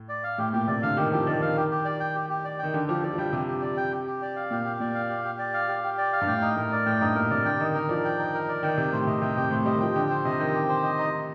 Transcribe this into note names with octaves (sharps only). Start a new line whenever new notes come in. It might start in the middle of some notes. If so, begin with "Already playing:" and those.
Already playing: A2
D5
F5
A2 G4
A#2 G4
C3 D5
D3 F5
D#3 G4
F3 G4
D#3 D5
D#3 F5
G4
G4
D5
G5
G4
G4
D5
D#3 G5
D3 G4
F3 G4
F3 D5
F3
G3 G5
C3 G4
G4
D5
G5
G4
G4
D5
F5
A#2 G4
G4
A#2 D5
F5
G4
G4
D5
F5
G4
G4
D5
F5
G2
A2 G5
D#4
A2 A#4
D5
A2 G5
G2 D#4
A#2 A#4
C3 D5
D3 G5
D#3 D#4
D#3 A#4
F3 D5
G5
D#4
A#4
D5
D#3 G5
C3 G4
A2 C5
C3 D#5
C3 G5
C3 G4
A2 C5
G3 D#5
D#3
F3 G5
D3 G4
C5
C3 D#5
D#3 G5
G4
C5
D#5
D#4
D#4